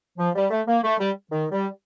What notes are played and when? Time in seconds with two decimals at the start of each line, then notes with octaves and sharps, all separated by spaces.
0.19 F3
0.36 G3
0.51 A3
0.67 A#3
0.83 A3
0.99 G3
1.31 D#3
1.52 G3